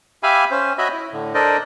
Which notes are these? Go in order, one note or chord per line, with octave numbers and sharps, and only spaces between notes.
G4 E5 F5 G#5 B5
C#4 C5
F#4 C#5 D#5 E5 B5
E4
A2 D3
D4 A4 A#4 C5 D5 D#5